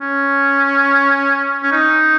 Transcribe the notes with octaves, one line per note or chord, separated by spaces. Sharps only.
C#4
C#4
D#4